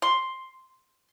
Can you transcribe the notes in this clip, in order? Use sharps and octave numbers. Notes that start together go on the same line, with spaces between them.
C6